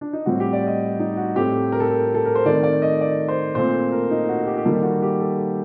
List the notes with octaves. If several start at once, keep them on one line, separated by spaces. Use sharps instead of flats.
D4
D#4
A2 G3 C4 F#4
G4
D5
D#5
D#4
F#4
A2 A3 C4 G4
A#4
A4
A#4
A4
A#4
C5
D#3 A3 C4 D5
D5
D#5
D5
C5
A#2 A3 C4 C5
A#4
D#4
F#4
G4
G4
D#3 G3 A#3 A4
F#4
G4
A4